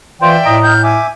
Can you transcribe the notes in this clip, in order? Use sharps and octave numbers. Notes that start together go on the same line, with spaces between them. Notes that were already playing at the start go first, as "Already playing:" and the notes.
E3 F4 C5 D5 E5 G5
A2 D#5 A#5
F6 G6
E5 G#5 D6